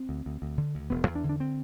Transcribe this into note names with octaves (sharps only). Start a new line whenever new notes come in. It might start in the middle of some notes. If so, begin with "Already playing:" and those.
Already playing: C4
D2
D2
D2
D3
D2
E1 B3
E2
D4
D3
D4
C4